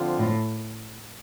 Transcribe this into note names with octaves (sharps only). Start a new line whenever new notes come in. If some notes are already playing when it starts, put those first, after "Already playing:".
Already playing: D3 F3 C4 F4
A2